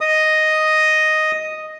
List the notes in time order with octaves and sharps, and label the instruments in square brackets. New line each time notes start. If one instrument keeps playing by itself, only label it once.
[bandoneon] D#5 D#6